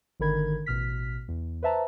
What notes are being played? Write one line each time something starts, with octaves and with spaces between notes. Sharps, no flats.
G#1 D3 D#3 A#4 B5 G#6
A1 B2 F6 B6
E2
B4 C5 E5 A5 A#5